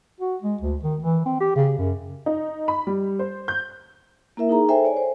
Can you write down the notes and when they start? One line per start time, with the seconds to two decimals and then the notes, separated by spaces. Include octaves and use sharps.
0.20 F#4
0.42 G#3
0.61 D2
0.83 D#3
1.02 E3
1.25 C4
1.40 G4
1.56 C#3
1.79 F#2
2.26 D#4
2.68 B5
2.87 G3
3.19 C5
3.48 G6
4.37 A#3 E4 A#4 E5
4.49 D#4 G#4 A#5
4.69 A4 C5 E5 G5 G#5
4.84 C#5 D5 G#5
4.97 C5